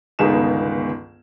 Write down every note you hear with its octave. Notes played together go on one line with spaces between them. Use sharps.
G1 C#2 D#3 B3 G#4 E7